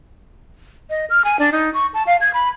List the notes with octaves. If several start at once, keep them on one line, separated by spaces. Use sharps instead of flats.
D#5
F6
G#5
D4
D#4
C#6
A5
F5
G#6
B5